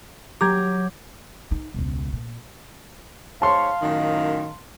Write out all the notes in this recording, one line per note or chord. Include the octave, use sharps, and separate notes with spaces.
F#3 G4 A#5 D6 G6 G#6
D#4
E1 C#2
A#2
G#2 C#5 F5 A5 C6
F#2 A2 D#3